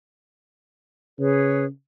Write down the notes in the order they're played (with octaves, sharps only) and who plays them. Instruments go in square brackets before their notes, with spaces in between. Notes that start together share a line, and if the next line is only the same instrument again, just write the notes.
[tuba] C#3 [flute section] G#4 B4 C#5